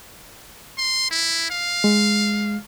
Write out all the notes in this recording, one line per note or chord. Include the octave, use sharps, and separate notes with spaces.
C6
E4
F5
G#3